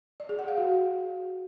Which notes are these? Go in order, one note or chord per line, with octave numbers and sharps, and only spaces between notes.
D5
G#4
F#5
F5
F#4